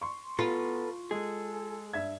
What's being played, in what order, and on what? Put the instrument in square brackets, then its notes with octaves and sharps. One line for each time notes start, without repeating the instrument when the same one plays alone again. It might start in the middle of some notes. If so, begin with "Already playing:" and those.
[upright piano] C6 C#6
[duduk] B3 [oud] F4 [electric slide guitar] A4 B4
[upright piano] G#3 [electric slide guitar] G#4 [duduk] A4
[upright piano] G2 E5 G#6